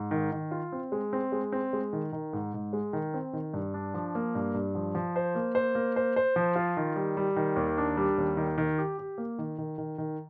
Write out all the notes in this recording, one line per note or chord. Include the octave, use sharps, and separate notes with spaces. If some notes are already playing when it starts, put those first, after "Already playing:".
Already playing: G#2
D#3
D#3
F4
C4
G#3
C4
G#3
C4
G#3
D#3
D#3
G#2
G#2
G#3
D#3
C4
D#3
G2
D4
F3
A#3
G2
G2
F3
F3
C5
A#3
C5
A#3
C5
C5
F3
F4
D#3
G3
G3
D#3
D#2
D4
G3
D#2
D#3
D#3
G4
G4
A#3
D#3
D#3
D#3
D#3